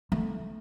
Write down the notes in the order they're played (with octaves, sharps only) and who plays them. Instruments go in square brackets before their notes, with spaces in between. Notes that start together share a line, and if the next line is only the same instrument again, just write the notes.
[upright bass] A3